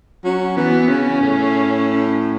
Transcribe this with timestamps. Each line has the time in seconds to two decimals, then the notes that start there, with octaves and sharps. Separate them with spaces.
0.24 F#3 C#4
0.56 E3 B3
0.89 C#3 C#4
1.21 A2